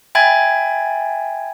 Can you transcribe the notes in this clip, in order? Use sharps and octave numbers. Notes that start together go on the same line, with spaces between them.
E5 G5 G#5 B5 G#6 A6